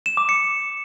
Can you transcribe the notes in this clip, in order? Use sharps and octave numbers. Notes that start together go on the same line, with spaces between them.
E7
D6
C#7